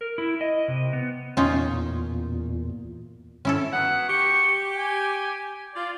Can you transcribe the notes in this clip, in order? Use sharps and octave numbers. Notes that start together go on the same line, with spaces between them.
A#4
E4
D#5
C3
B3
E2 A#2 C#4 D#4 F4
C#4 E4 A4
F#3 B3 F#5
G4 C#6
G#5
F4 D5